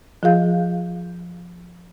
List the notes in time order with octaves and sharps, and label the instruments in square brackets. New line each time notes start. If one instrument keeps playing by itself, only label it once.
[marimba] F3 F4 G#4 F5 G6